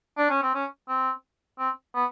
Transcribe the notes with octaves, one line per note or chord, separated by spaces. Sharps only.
D4
C#4
C4
C#4
C4
C4
B3